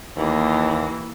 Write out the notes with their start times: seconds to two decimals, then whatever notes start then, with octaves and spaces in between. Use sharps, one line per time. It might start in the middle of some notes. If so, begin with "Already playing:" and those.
0.16 D#2 E3 A#3